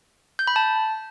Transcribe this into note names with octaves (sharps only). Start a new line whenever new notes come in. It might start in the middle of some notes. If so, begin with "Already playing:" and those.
G6
B5
A5